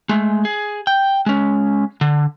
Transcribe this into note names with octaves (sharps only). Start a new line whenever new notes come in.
G#3 A3
G#4
G5
G#3 C#4
D3